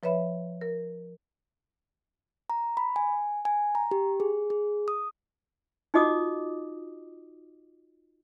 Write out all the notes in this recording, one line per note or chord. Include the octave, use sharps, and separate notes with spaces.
F3 B4 C#5 E5 B5
A#4
A#5
B5
G#5
G#5
A#5
G4
G#4
G#4
D#6
D#4 F4 F#4 D#5 D6 D#6